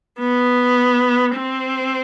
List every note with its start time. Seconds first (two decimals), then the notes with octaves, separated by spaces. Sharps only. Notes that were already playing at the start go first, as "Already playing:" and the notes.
0.20 B3
1.36 C4